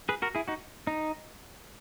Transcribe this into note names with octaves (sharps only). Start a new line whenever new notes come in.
G#4 B4
F#4 A#4
E4 G#4
D#4 F#4
D#4